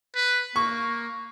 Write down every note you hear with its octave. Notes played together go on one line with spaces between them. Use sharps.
B4
A#3 C#6